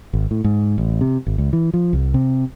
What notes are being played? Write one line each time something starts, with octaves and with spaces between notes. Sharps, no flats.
G#1
A2
G#2
A1
C3
G#1
C#2
E3
F3
C2
C3